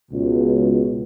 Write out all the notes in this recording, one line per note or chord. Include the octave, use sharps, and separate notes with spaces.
C#2 B2